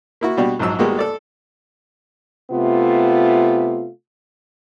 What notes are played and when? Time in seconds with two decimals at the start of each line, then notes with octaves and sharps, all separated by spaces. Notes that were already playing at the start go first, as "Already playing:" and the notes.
0.21 A#3 E4 F#4
0.37 B2 G3 D4 F#4
0.59 A#1 G#2 F#3 E6
0.79 G#1 G3 G#3 A#3 B3 F#4
0.99 A4 D5
2.51 C3 A3 B3 F4